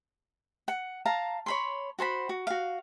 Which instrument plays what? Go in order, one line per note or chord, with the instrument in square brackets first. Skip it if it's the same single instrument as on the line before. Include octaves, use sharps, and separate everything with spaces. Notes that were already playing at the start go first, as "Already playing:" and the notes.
[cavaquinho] F#5
F5 A5 A#5
C#5 B5 C6
F#4 C5 A5 B5
F#4
F#4 F5